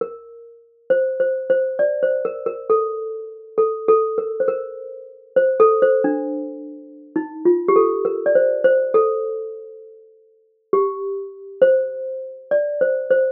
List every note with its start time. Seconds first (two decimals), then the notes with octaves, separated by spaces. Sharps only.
0.01 A#4
0.90 C5
1.20 C5
1.50 C5
1.79 D5
2.03 C5
2.25 A#4
2.46 A#4
2.70 A4
3.58 A4
3.88 A4
4.18 A#4
4.40 C5
4.48 A#4
5.36 C5
5.60 A4
5.82 C5
6.04 D4
7.16 D#4
7.45 F4
7.68 G4
7.76 A4
8.05 A#4
8.26 D5
8.35 C5
8.64 C5
8.94 A4
10.73 G4
11.62 C5
12.51 D5
12.81 C5
13.11 C5